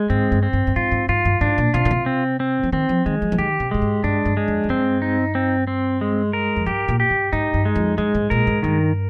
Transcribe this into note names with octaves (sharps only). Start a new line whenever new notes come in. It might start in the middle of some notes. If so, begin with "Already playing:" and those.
Already playing: G#3
G#2 C4
G2
C4
G2
G2
G#2 F4
G#2
G#2 F4
G2
G#2 D4
A#2
C3 F4
A#2
C3
C4
C4
F3
D#3 C4
F3
D#3 G#3
F3
F3
D#3 G4
C3
A#2 G#3
G#2
G2 D4
G2
G#3
F2
F2
G2 C4
D#4
C4
C4
G#3
A#4
F2
G2 G4
A#2
G4
G2
G#2 D#4
G2
G#3
F2
G2 G#3
G#2
A#2 A#4
G#2
G2 D#3